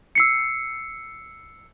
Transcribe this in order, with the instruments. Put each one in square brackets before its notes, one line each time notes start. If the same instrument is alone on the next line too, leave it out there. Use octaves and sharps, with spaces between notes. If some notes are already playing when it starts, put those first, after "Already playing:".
[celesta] E6 C7 C#7